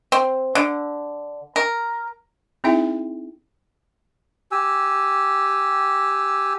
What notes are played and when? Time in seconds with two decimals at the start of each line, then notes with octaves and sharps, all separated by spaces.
0.12 C4
0.55 D3
1.56 A#4
2.64 C4 D#4 E4 G#4 E5 G5
4.52 G4 G#5 E6